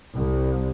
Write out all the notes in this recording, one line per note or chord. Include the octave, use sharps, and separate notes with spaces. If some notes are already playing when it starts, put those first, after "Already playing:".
C2